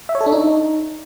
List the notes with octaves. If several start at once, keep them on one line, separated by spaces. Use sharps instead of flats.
E5
C#5
A4
D4
D#4